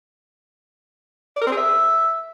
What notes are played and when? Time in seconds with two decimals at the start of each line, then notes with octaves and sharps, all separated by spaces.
1.36 D5
1.42 A#4
1.47 C4
1.52 G#4
1.57 E5